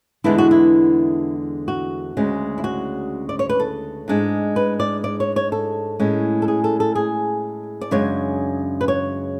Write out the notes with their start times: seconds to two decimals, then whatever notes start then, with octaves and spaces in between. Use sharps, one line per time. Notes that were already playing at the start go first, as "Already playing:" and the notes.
0.24 E2 D3 G#3 B3 D4 E4
0.38 F#4
0.51 E4
1.68 F#4
2.17 D2 C#3 G#3 C#4
2.58 E4
2.64 F#4
3.29 D5
3.39 C#5
3.49 B4
3.60 A4
4.08 G#2 G#3 D4
4.56 B4
4.80 D5
5.04 D5
5.20 C#5
5.36 C#5
5.52 A4
6.00 A2 G#3 C#4
6.42 A4
6.48 G#4
6.64 A4
6.80 A4
6.95 G#4
7.81 D5
7.91 F#2 C#3 G#3 D4 C#5
8.81 B4
8.88 C#5